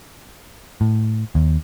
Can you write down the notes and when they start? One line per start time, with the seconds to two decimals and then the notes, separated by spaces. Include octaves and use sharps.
0.81 A2
1.35 D#2